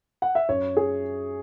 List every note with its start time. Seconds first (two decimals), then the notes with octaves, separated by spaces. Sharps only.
0.22 F#5
0.35 E5
0.49 F#2 C#5
0.77 G#4